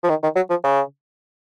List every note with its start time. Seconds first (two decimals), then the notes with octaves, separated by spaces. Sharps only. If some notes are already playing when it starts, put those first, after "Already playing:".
0.04 F3
0.09 D#3
0.23 D#3
0.36 F#3
0.50 F3
0.64 C#3